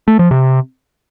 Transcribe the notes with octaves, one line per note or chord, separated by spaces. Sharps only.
A3
F3
C3